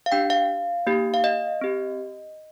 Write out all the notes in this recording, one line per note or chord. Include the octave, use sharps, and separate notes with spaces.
F5
D4 G4 G5
F5
A#3 D#4 G4
F5
D#5
C4 G4